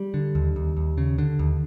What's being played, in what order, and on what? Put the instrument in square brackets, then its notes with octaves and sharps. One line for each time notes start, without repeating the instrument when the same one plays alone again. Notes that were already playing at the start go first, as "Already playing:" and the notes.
Already playing: [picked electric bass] G3
D3
D#2
D#2
D#2
C#3
D3
D#2